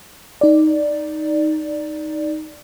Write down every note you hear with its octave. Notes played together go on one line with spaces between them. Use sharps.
D#4 D5